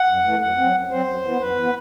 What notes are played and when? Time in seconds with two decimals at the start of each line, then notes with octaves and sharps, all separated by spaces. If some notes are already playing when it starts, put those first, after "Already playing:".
Already playing: F#5
0.08 F#2
0.25 E3 A3
0.41 F#2 F#5
0.57 F#3 C4
0.75 F#2
0.91 F#3 C4 C5
1.07 F#2
1.23 E3 B3
1.39 F#2 B4
1.56 E3 B3